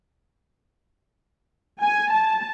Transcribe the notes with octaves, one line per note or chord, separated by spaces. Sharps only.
G#5
A5